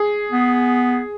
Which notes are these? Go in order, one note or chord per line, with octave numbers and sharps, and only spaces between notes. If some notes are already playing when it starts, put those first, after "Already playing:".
Already playing: G#4
B3